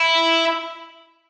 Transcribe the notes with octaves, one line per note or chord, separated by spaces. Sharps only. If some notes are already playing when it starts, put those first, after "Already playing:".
Already playing: E4